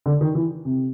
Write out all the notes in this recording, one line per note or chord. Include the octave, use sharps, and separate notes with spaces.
D3
D#3
E3
C3